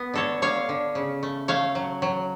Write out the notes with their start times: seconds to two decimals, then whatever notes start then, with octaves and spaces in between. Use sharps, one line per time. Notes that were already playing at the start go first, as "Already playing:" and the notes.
Already playing: B3
0.14 D3 A4 C#5
0.42 D3 C#5 F5
0.69 D3
0.95 C#3
1.23 A3
1.48 A3 C#5 F5
1.75 F#3
2.02 F#3